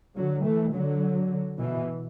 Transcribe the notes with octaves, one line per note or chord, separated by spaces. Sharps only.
D3 F#3
E3 A3
D3 F#3
B2 E3